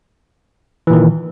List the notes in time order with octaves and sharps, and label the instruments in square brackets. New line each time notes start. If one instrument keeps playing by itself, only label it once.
[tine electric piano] E3
A#2
D#3